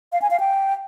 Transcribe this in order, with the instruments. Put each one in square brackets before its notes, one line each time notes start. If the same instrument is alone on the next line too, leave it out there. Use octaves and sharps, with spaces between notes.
[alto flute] F5
G#5
F5
G5